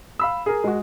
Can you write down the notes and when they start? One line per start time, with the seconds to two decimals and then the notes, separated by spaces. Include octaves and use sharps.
0.19 F5 B5 E6
0.46 G#4 A#4
0.64 G#3 F#4